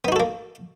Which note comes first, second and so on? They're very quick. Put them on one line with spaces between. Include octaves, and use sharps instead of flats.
B3 D#4 F#4 A4 A#3